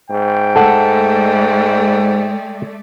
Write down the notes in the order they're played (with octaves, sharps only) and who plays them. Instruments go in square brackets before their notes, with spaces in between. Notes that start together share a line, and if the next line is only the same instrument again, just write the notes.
[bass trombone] G#2 [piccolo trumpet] G5
[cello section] G#3 A3 D5 [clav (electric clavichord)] A4 F#5